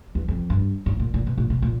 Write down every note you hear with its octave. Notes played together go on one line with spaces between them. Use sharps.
E2
F2
G2
G#2
A#2
A#2
B2
A#2
B2
A#2